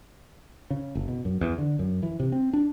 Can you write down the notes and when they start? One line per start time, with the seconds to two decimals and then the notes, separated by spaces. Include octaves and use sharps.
0.70 C#3
0.95 F#1
1.08 B2
1.25 F#2
1.41 E2
1.58 D3
1.79 F#2
2.03 E3
2.20 C3
2.32 C4
2.53 D4